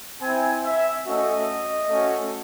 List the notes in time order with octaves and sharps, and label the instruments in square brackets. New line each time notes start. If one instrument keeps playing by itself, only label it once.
[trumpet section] C4 E4 G#5
E5
A3 C#4 F#4 D#5
A3 C#4 F#4